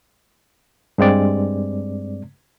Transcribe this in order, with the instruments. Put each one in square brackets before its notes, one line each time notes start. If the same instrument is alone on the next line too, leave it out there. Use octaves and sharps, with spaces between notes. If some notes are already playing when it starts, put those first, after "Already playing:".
[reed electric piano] G2 G#3 C4 D5